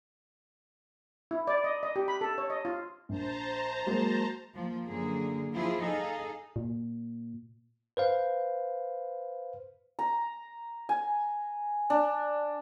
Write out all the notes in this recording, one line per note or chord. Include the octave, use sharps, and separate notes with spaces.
E4
D5
D#5
D#5
G4
B5
A4
C#5
D#5
F4
A#1 C5 A5 A#5
F#3 G#3 A#3
F3 A#3
F#2 D3 A#3 G#4
F3 E4 F4 G#4
D#4 G#4 A4 D#5 F5
A#2
B4 C5 F5
A#5
G#5
D4